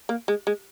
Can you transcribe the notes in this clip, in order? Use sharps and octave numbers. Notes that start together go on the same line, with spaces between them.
A#3
G#3
G#3